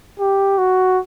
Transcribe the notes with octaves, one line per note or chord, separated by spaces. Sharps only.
G4
F#4